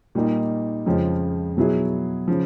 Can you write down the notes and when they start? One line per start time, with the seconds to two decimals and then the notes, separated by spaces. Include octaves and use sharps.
0.15 A#2 G3 A#3 D#4
0.86 F2 C#3 F3 G#3 C#4
1.57 B2 F#3 B3 E4 G#4
2.28 C#3 F3